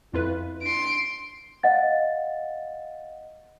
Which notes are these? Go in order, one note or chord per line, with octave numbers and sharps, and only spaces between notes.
F2 E4 F4 B4
D4 C6 D7
D#5 F5 F#5 A6